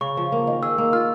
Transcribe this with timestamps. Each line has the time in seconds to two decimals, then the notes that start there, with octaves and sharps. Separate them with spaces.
0.01 C#3 C#6
0.17 F3
0.32 A#3
0.47 D#3
0.63 G#4 E6
0.78 A#3
0.93 F4 F6